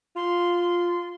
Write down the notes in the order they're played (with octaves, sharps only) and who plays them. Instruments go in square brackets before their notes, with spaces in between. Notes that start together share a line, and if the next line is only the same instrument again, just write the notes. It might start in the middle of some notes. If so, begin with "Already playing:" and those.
[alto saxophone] F4 [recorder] C6